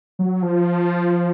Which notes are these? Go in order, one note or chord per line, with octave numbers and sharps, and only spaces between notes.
F#3
F3